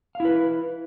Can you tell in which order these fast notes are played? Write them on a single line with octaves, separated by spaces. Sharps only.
F5 E4 B4